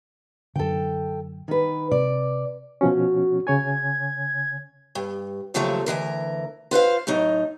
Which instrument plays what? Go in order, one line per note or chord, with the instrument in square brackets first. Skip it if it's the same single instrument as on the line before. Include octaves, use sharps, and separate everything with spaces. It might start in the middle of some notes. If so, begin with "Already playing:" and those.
[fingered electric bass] F#2 D3 [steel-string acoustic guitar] A4 G5
[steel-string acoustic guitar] D#3 B4
[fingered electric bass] C3 [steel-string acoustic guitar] D5
[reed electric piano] B2 F3 C#4 [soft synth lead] F#4
[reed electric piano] C#3 C#5 G#5 [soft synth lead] G#6
[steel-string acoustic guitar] G2
D#2 C#3 F3 F#3 A3
D2 A#2 E3 A#4
F4 B4 C5 F5
A2 F#3 D#4